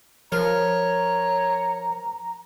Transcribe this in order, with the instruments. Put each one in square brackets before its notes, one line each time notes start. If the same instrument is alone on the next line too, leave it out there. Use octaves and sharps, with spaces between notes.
[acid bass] F3 [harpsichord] A#4 [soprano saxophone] C#5 [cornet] A#5